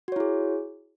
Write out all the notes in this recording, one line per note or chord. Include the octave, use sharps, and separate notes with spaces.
E4 F#4 G#4 C#5